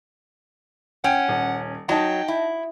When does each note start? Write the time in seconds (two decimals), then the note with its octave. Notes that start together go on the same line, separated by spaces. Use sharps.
1.04 C#4 F#5 G5
1.28 D#1
1.89 F#3 D#4 D#5 G5 A5
2.28 E4